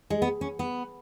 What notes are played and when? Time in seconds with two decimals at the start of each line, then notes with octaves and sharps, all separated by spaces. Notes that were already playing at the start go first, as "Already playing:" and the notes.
0.10 G#3
0.22 B3
0.41 C#4
0.59 B3